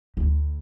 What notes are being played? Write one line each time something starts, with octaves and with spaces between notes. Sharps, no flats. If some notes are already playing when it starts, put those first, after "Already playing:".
D2